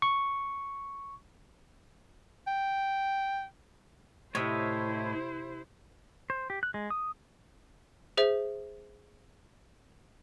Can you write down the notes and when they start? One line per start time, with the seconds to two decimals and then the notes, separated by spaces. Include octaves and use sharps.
0.02 C#6
2.47 G5
4.35 A2 C3 E4 C5 C#5 D#5 E5
6.30 C5
6.50 G4
6.63 F#6
6.74 G#3
6.90 D#6
8.17 G#4 C5 E5